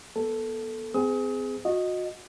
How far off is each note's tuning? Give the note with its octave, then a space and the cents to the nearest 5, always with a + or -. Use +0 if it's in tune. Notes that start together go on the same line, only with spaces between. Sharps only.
B3 -35 A4 +0
C4 -35 G#4 +0 D#6 +35
F#4 -30 D#5 +0